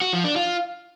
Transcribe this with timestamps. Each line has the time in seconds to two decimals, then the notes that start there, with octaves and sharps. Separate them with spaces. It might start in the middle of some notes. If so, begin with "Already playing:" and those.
0.01 F#4
0.13 F3
0.25 D4
0.36 F4